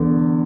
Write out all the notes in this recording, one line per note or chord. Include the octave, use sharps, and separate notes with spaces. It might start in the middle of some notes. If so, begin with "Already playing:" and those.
Already playing: E2 D3